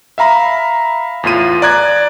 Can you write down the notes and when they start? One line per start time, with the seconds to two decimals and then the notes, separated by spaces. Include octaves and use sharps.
0.18 E5 F5 A#5 B5
1.24 E2 A2 F4 D#7
1.62 D5 A#5 F#6 G#6